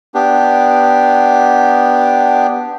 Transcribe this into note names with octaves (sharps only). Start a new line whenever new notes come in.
B3 D4 G4